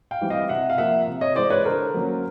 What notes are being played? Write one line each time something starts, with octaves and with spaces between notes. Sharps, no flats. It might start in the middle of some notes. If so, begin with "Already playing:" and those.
F5 G5
E3 G3 C4
D#5 F5
C3 E5 F#5
F5
F3 A#3 E5 F#5
C3
C#5 D#5
E3 G#3 C5 D5
B4 C#5
D3 A#4 C5
F#3 A#3 C#4